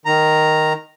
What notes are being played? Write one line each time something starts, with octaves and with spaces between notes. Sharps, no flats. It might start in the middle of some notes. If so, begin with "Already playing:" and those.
D#3 A#5